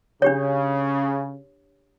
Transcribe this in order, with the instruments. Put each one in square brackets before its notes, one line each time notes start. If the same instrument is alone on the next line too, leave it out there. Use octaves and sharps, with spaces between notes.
[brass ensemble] C#3 [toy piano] D4 G4 C#5